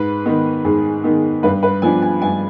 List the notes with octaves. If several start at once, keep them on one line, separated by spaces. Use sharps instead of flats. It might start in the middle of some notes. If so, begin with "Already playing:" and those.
Already playing: G#2 B4
D#3 B3 D#4
G#2 G#4
D#3 B3 D#4
G2 B4
B4
F3 B3 D4 G#5
G#5
G2 G#5